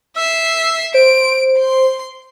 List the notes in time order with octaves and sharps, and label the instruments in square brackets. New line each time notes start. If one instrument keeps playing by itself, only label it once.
[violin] E5 C7 [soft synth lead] E6
[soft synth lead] C5 [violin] D7
[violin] C6